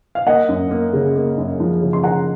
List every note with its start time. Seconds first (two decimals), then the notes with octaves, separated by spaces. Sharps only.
0.15 F5
0.27 A#3 D#5 F#5
0.49 F#2
0.71 A#3
0.93 C#3
1.16 A#3
1.37 F#2
1.60 F3
1.82 C#3
1.93 C6
2.03 C#3 F#5 A#5